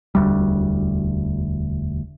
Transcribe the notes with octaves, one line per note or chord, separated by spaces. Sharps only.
E1 D2 G3